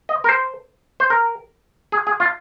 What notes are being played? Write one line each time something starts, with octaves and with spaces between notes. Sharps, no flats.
D#5
A#4
C5
C5
A#4
G#4
G#4
F4